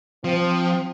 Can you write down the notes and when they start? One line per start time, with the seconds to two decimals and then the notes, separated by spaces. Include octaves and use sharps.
0.24 F3 C4